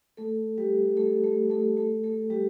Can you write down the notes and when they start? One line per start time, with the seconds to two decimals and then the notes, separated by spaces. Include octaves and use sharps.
0.17 A3 A4
0.58 G3 G4
0.97 A3 A4
1.24 A3 A4
1.50 A3 A4
1.77 A3 A4
2.03 A3 A4
2.30 G3 G4